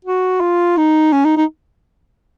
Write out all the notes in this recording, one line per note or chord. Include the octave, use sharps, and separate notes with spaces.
F#4
F4
D#4
C#4
D#4
D#4